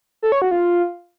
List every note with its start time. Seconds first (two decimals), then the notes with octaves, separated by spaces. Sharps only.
0.23 A4
0.32 C#5
0.42 F#4
0.51 F4